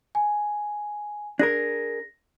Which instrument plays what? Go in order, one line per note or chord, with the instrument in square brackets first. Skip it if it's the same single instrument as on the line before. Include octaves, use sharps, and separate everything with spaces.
[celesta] G#5
[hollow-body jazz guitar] D4 G#4 A#4 [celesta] A#6